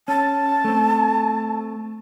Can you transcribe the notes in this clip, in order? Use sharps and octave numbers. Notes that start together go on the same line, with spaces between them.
C#4 A5
A3 C4